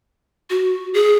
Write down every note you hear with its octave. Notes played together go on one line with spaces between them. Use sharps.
F#4
G#4